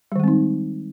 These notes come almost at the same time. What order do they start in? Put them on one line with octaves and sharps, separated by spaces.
G3 D#3 G#3 C4 D#4